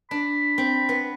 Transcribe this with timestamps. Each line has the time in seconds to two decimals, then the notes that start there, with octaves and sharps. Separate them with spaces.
0.10 D4 B5
0.58 C4
0.89 B3